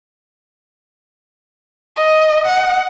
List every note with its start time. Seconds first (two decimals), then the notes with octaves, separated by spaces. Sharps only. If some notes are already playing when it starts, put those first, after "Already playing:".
1.97 D#5
2.47 F#5